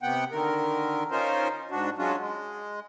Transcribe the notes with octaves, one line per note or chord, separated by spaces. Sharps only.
C3 B3 F#5 G5
D3 D#3 A#4
C#4 D#4 F4 A#4 C5
G#2 D4 F#4
F#3 G#3 C#4 D4 F4 F#4
G#3